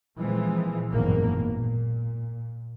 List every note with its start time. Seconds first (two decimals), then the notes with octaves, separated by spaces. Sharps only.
0.16 A#2 E3 F3 G#3 C4
0.89 G#1 F#2 B2 E3 A#3
1.48 A#2